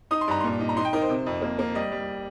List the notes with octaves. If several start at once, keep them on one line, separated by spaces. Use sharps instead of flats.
D#4 D#6
C6
G2 A#5
A#2 C6
D#4
A#5
D#4 C6
G5
D#4 A#4
C5
C3
F2
A#3
A#3
G3 D#5
G3